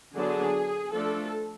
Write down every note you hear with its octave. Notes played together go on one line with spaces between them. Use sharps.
D3 F#3 B3 D4 G#4
F3 A3 D4 A4